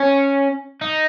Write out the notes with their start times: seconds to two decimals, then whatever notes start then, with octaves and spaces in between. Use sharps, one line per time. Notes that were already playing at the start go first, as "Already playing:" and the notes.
Already playing: C#4
0.81 D#4